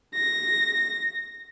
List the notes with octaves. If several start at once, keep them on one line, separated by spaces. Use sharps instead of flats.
A#6